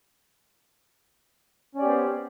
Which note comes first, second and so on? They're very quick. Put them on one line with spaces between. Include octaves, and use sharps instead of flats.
C#4 D5 G4 B3 C5